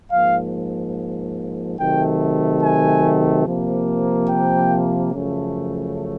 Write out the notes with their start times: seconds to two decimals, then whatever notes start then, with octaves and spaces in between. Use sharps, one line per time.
0.10 G#2 F3 A#3 F5
1.77 C3 D#3 F#3 A3 G5
2.61 G#5
3.45 C3 F3 A#3
4.29 G5
5.13 F#2 C#3 F3 A3